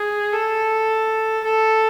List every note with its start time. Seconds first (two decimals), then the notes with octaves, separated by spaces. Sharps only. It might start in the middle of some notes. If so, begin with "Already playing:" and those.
Already playing: G#4
0.33 A4
1.44 A4